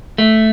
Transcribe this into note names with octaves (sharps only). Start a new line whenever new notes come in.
A3